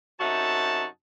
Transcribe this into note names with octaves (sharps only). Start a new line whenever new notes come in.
F#2 C3 D#4 F#4 E5 A5